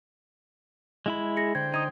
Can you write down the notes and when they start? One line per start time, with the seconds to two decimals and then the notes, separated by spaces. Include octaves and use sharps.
1.06 G#3 E4 B5
1.37 G#4 A#6 C#7
1.55 D3 C5 G5 G#6
1.74 D#4 D#6 G#6